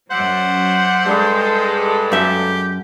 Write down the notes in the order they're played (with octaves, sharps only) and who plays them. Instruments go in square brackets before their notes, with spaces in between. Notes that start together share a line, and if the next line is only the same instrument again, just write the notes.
[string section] F#2 F#3 [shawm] C5 [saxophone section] D5 E5 F#5
[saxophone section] G2 [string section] G#3 A4
[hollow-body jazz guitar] F#2 E5 [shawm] G4